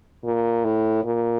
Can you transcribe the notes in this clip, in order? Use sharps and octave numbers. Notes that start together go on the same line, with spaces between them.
A#2
A2
A#2